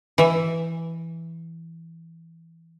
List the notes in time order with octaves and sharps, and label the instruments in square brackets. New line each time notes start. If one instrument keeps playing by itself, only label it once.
[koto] E3 E5